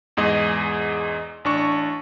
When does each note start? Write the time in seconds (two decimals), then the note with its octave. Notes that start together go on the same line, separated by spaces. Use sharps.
0.17 E2 G#2 G#4 D#5
1.45 A1 D4 C#6